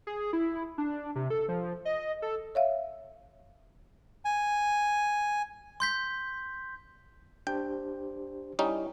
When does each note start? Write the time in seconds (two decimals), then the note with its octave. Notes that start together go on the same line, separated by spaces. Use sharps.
0.07 G#4
0.33 E4
0.78 D4
1.16 C3
1.30 A4
1.49 F3
1.85 D#5
2.22 A4
2.55 C#5 E5 F5
4.25 G#5
5.80 C6 G6 B6
7.47 D4 G4 C5 G5
8.59 G3 C#4 D#4 E4